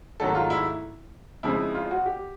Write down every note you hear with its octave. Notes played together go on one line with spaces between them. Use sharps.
G#2 D#3 F#3 A3 A4
F4
E4
F2 C#3 F3 G#3 E4
F4
F#4
G4